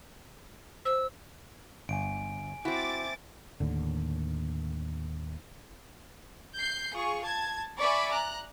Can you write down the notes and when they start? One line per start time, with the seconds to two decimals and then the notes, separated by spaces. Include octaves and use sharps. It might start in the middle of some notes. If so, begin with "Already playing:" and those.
0.85 C5 E6
1.89 G1 G#5 D7
2.65 C4 E4 F#4 D6 A6
3.60 D#2 A2 D3
6.57 G6 C7
6.94 F4 G#4 C#6
7.25 A5 G#6
7.79 D5 E5 G#5 B5 C#6
8.12 A#5 F#6